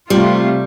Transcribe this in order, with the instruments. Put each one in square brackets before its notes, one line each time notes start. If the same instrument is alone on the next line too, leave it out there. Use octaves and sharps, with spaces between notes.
[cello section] C3 A3 F4 [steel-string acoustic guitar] G3